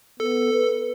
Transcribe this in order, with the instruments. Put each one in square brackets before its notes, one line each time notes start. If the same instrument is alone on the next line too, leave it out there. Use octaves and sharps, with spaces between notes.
[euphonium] B3 [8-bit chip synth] A4
[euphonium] B4